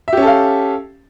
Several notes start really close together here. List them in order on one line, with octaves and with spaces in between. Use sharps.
E5 G4 C#4 A4 F5